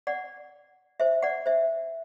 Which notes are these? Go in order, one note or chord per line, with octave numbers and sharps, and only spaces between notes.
D5 F#5
C5 E5
D5 F#5
C5 E5